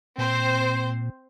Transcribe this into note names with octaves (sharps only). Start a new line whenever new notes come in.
A#2 C4 C5